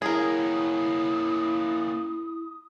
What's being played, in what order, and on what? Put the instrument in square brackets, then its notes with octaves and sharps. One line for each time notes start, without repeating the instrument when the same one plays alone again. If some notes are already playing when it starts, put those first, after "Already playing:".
[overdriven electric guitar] A#3 C#4 [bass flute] E4 [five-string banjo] G#4 A#4 [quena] D#6